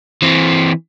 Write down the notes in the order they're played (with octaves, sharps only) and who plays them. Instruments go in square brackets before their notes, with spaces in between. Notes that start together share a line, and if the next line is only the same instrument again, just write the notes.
[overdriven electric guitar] E3 C4